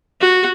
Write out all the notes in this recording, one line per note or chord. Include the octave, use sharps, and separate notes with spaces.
F#4